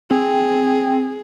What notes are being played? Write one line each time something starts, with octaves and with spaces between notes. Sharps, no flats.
C4 G#4